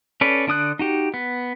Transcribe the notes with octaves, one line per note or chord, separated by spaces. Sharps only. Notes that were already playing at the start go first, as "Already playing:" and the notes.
C#4 A4 B4 D5
D3 D4 D#6 F#6
D#4 F#4 G4
B3